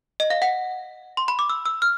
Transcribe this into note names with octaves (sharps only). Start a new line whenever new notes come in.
D#5
F5
F#5
C6
B5
D6
E6
E6
F6